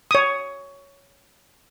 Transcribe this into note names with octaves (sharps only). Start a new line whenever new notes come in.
C#5 D#6